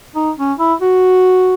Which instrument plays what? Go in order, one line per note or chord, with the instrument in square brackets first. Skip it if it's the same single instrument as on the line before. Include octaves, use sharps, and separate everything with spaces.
[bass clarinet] D#4
C#4
E4
F#4